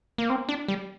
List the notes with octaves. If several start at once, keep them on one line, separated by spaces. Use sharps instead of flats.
A#3
C4
D4
G3